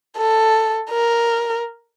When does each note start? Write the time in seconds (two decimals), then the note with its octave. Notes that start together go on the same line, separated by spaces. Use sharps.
0.17 A4
0.90 A#4